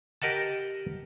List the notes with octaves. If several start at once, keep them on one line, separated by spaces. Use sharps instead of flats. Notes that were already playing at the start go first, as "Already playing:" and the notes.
G4 A#4 D#5 F#5 A5